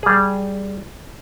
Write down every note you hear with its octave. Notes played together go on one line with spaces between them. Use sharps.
G3 G#4